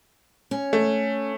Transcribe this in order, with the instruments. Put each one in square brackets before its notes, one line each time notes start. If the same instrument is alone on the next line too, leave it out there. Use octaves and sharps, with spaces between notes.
[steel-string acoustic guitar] C#4
[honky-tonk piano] A3